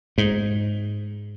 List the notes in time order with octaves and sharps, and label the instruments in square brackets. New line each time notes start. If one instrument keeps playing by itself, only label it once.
[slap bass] G#2